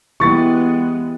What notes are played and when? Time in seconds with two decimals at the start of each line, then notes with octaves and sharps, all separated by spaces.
0.20 E3 G#3 B3 E4 G4 C#6 A6